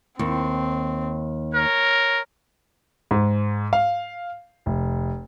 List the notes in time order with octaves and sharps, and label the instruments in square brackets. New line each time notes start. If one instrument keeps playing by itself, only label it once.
[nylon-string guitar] D#2 [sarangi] C4
[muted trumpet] A#4 [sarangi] C#5
[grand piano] G#2
F5
F1